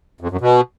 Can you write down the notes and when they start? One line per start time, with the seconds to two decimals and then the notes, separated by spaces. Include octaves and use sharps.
0.21 F2
0.31 F#2
0.41 B2